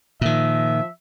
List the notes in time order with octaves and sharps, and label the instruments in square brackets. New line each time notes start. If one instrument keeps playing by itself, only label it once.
[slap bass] A#2 D#3 [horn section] F3 E5